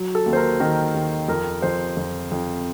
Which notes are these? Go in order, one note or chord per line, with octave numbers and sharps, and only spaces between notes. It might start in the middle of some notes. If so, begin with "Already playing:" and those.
Already playing: F#3
A4
D#2
C5
A#4
D#3 A#4
D#2
F2 A#4
F2 C5
F2
F2